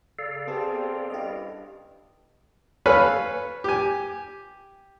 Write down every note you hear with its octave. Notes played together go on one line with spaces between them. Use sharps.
C#3 A4 D5 F5
B3 C4 G4 G#4 A5
G2 B3 C#4 E4 G4 D#5
A4 B4 C#5 F5 G#5 B5
G4 G#5